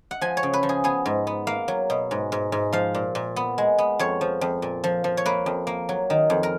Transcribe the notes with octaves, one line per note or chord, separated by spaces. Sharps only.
F#5
F3 G#5
C#5
C#3
B4
F3
G#4
B3 G#4
G#2
B3
A#3 F5
F#3
B2
G#2
G#2
G#2
F3 F5
A#2
A#2
B3
G#3
B3
F2 C#5
F3
F2
A#2
F3
F3
C#5
A#3 B4
F2
A#3
F#3
D#3
F2
A#4